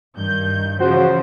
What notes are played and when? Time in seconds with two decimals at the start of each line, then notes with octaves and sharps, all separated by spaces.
0.16 G2 D#3 G6
0.80 C#3 E3 F3 F#4 C5